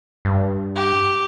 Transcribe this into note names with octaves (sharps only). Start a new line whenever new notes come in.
G2
G4